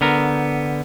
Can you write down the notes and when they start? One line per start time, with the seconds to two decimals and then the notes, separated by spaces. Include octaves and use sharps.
0.01 D3 B3 A#4